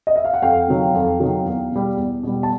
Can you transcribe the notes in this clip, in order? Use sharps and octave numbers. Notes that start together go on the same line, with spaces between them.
D#5
E5
F5
F#5
F2 F5 G5
C3 D#3 F#3
F2
C3 D#3 F#3
E2
B2 G3
E2
B2 G3
A5